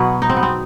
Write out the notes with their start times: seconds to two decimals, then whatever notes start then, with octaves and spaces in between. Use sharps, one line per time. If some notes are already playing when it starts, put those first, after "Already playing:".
Already playing: B2 F#3 B3
0.22 D#4
0.30 C4
0.37 B3
0.43 C4